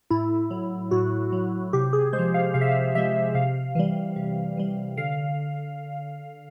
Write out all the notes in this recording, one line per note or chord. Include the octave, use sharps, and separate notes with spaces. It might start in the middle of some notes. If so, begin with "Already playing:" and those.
A2 E4
F#3
A2 F#4
F#3
C3 G4
G#4
G#3 C5
F3
F5
C3 F5
E5
F5
F3 G#3 E5
C3 F5
E3 G3
C3
E3 G3
D3 F5